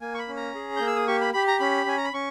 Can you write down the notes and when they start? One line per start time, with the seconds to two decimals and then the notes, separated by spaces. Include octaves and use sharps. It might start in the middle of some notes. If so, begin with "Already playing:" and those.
0.01 A#3 G#5
0.14 C#6
0.19 B5
0.28 C#4
0.37 A#5
0.55 G#4
0.76 A#3 G6
0.87 E6
0.96 D#6
1.07 G4 C#6
1.21 B5
1.34 G4 B5
1.47 A#5
1.60 C#4 B5
1.86 C#4 G#5
1.97 A#5
2.05 B5
2.13 C#4 C#6